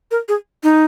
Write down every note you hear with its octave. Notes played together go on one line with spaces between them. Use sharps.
A#4
G#4
D#4